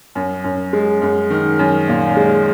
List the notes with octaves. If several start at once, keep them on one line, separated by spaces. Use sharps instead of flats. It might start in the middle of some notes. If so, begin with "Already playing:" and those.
F#2
F#2
G#3
F#2
D#3
F#2
A#2
G#3